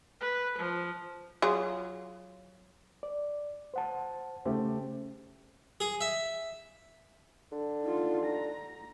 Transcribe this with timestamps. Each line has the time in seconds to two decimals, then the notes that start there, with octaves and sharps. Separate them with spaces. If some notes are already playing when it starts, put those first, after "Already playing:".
0.21 B4
0.58 F3
1.42 F#3 F4 G#4
3.03 D5
3.74 C5 F#5 A5
4.45 C#3 A3 G4 C5
5.80 G#4
6.01 E5
7.52 D3
7.83 D#4 F4
8.25 A#5